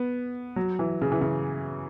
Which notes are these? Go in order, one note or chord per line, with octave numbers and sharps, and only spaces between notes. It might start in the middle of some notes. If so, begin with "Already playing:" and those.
Already playing: B3
F#3
E3
C#3
E3
C#3